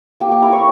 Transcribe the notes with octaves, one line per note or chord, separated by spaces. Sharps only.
A#3 G4 G5
G4 G5
E4 A#4 A#5
C#5 C#6